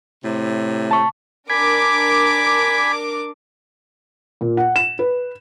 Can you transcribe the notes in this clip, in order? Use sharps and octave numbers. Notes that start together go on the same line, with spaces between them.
A2 C3
A5 C#6
D4 A#4 G#5 B5 D6
A#2
F#5
E7
B4